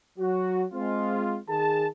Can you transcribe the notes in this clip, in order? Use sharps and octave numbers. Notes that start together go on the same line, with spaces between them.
F#3 F#4
G#3 C4 F4
D#3 G#4 A5